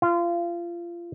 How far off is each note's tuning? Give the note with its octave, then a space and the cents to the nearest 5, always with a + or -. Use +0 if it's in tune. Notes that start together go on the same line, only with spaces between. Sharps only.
F4 -25